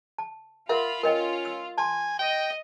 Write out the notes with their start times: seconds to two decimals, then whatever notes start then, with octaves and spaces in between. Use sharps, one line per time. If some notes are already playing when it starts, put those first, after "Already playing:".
0.18 A5
0.69 F4 A#4 E5 F#5 B5
1.03 C#4 A#4 D#5 G5
1.45 E6
1.78 G#5 A5 C6
2.19 D#5 G5